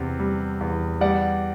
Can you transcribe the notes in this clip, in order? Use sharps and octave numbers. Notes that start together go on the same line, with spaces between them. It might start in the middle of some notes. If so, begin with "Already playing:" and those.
Already playing: E2 C3
G3
E2
G3 D5 F#5